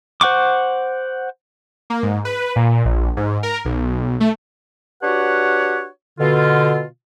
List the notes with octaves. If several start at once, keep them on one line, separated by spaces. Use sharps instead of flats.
C5 F#5 C#6 D6
A#3
G#2
B4
A#2
A#1
G#2
A#4
B1
A3
D4 F#4 G4 B4 C#5 F#5
B2 D3 F4